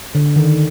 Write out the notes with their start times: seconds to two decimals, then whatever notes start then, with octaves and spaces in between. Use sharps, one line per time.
0.15 D3
0.36 D#3